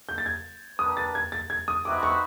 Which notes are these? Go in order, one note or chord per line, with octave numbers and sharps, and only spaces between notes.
G6
A6
G#6
A#3 D4 G4 B4 D#6
A6
G#6
A6
G#6
D#6
C4 D#4 F#4 B4 E5 D6
C#6